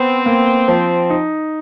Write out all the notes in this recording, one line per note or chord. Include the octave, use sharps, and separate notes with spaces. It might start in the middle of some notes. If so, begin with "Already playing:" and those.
Already playing: B3 C4
A#3
F3
D#4